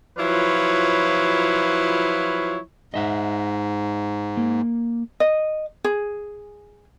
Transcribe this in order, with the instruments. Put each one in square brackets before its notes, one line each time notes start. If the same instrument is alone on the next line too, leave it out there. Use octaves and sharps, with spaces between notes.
[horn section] F3 F#3 E4 F4 B4 C#5
[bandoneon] G#2 [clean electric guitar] D#5 E5 F#5
[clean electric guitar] A#3
[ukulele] D#5
G#4